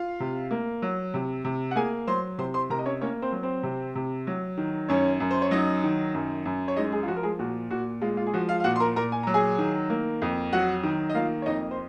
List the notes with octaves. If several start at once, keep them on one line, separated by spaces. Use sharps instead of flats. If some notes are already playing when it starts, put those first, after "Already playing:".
Already playing: F4 F5
C3
A#3
F#3
C3
C3
F#5
A#3 G#4 G#5
F#3 C5 C6
C3 C5 C6
C5 C6
C3 A#4 A#5
D#5
C#4 C#5
A#3 C#4 C#5
C4 C5
F#3
C4 C5
C3
C3
F#3
D#3
F#2 C#4 C#5
F#2
C5
C#5
F#3 D#4 D#5
D#3
F#2
F#2
C#5
G#3 D#4 D#5
G#3 G#4
F4
F3 F#4
A#4
G#3 G#4
A#2 F#4
A#2 F#4
G#3 F4
F4
G#4
F3 F#4
F4 F5
F5
A#2 F#4 F#5
C6
A#4 A#5
A#2 A#4 A#5
G#5
F#3 A#5
G#4 G#5
D#3
A#3
F2
F#3 F#4 F#5
D#3
D#5
A#3 F4 F5
C#5
F2 D#4 D#5
C5